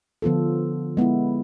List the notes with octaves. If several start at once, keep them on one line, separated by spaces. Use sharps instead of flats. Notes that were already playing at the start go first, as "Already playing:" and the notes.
D3 F3 B3 F4 A4
G#3 B3 E4